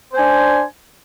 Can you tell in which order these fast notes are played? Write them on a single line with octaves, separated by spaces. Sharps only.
C5 G#5 D4